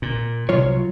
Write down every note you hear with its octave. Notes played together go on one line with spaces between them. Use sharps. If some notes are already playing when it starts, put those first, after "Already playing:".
A#2
C2 F#3 F4 C#5